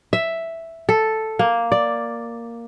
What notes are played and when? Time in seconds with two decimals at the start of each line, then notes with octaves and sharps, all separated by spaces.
0.13 E5
0.89 A4
1.39 A#3
1.72 D5